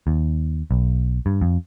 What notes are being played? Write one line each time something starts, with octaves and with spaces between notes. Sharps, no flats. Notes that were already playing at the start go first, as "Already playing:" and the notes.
D#2
B1
G2
F2